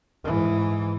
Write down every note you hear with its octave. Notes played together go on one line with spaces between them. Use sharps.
G#2 E3